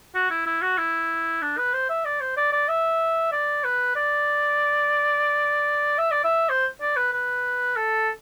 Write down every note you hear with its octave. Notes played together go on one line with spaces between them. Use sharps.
F#4
E4
E4
F#4
E4
D4
B4
C5
E5
D5
C5
D5
D5
E5
D5
B4
D5
E5
D5
E5
C5
D5
B4
B4
A4